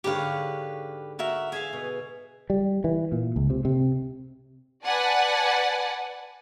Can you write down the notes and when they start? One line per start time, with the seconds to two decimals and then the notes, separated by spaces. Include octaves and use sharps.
0.04 G#2 D3 G4 B4 C#5 F5
1.19 F#4 A#4 E5
1.52 G#4 E5 F5 G#5
1.73 B2
2.50 G3
2.84 E3
3.12 A#2
3.36 C#2
3.50 C3
3.65 C3
4.85 B4 D5 F#5 G#5 A5